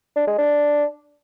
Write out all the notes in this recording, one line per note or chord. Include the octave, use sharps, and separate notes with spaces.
D4
G#3
D4